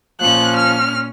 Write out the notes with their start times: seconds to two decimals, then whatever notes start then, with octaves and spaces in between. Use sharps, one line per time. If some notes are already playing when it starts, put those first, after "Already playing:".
0.21 A#2 F3 C#4 F#6
0.56 F6